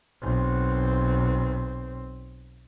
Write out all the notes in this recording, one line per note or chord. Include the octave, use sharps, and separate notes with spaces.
B1 C4